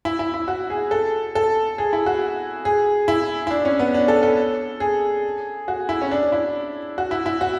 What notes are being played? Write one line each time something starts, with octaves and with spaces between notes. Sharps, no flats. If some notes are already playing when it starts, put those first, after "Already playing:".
E4
E4
E4
F#4
G#4
A4
A4
G#4
E4
F#4
G#4
E4
E4
D4
C#4
B3
D4
A4
A4
G#4
F#4
E4
C#4
D4
E4
F#4
E4
E4
F#4